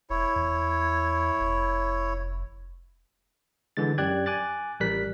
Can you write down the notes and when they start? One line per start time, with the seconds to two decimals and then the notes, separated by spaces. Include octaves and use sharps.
0.10 E1 E4 C#5
0.36 E2
1.40 F1
3.77 D3 E3 G#3 A6
3.98 F#2 G4 D5 G5 F#6 G#6
4.26 G#5 D6 F#6 A6
4.80 A1 G3 A#4 F#6 B6